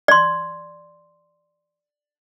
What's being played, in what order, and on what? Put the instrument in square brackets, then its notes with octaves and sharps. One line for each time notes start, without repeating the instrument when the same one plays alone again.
[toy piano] D5 C6